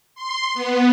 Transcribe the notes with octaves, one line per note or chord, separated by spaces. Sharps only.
C6
B3